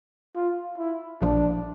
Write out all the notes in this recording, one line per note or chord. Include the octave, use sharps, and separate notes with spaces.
F4
E4
A#1 A#2 F3 D4